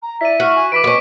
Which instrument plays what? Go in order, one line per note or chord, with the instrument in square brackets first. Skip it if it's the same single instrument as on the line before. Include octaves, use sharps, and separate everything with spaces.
[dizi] A#5
[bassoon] E4 [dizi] D5 [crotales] B6 D#7
[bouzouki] F#4 [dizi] F6
[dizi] G#5
[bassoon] E3 [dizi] B5 [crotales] D6 B6 D7
[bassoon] B2 [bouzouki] B3 C#4